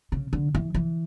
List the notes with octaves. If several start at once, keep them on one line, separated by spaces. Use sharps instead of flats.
C#3
D3
E3
E3